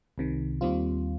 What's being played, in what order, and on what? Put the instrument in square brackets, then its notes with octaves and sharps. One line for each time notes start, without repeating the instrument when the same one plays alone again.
[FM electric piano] C2 C3 D#3
D#2 D#3 G3 C4 F4